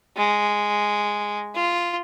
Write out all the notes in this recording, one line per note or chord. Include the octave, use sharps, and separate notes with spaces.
G#3
F4